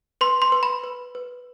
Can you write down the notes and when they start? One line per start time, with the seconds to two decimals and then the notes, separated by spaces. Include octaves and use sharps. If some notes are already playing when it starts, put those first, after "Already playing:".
0.21 B4 C6
0.42 C6
0.52 B4
0.63 B5
0.84 B4
1.15 B4